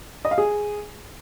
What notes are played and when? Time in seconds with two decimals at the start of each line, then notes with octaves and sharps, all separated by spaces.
0.25 D#5
0.31 F5
0.38 G#4